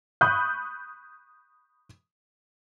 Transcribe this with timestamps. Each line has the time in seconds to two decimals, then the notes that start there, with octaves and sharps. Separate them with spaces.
0.21 B5 C#6 D#6 F#6 G6